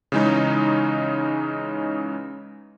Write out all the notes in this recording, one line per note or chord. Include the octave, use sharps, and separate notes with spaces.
C#3 E3 G#3 C#4 D#4